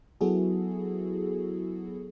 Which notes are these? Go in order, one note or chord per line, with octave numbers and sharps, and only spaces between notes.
F#3 B3 E4 F#4 G#4 A4